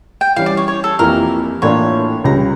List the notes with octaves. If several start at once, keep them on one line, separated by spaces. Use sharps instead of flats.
G5
E3 G3 C#4 F5
D5
C#5
C#5
A4
F2 E3 A#3 E4 G4 A#4
A2 E3 A#3 D4 F4 C#5
C#2 C#3 G3 A#5